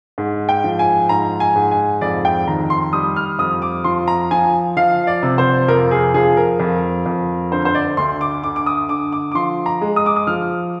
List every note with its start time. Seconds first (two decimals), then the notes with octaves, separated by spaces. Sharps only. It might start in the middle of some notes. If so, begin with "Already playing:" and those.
0.18 G#2
0.49 G5
0.64 F3
0.79 G#5
1.09 G#2 A#5
1.40 G#5
1.56 G#2
1.71 G#5
2.01 F2 D5
2.25 G5
2.47 D#3 A#5
2.70 C6
2.93 G3 D#6
3.16 F6
3.39 F2 D#6
3.62 D6
3.84 F3 C6
4.08 A#5
4.31 F3 G#5
4.77 F3 F5
5.07 D5
5.23 C3
5.38 C5
5.68 F2 A#4
5.91 G#4
6.14 F3 G#4
6.37 A#4
6.60 F2
7.06 F2
7.51 D3 C5
7.65 C5
7.75 D5
7.97 D2 C6
8.21 D6
8.44 D3 D6
8.56 D6
8.66 D#6
8.89 D3 D6
9.12 D6
9.32 D6
9.35 F3 C6
9.66 A#5
9.81 G#3
9.96 D#6
10.06 D6
10.16 D#6
10.27 F3 F6